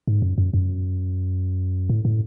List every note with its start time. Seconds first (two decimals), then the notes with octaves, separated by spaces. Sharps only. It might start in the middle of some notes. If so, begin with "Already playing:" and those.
0.07 G#2
0.22 F#2
0.38 F#2
0.54 F#2
1.90 A2
2.05 A2